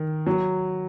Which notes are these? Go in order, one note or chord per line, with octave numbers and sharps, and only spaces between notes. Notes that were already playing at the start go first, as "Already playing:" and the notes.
Already playing: D#3
F#3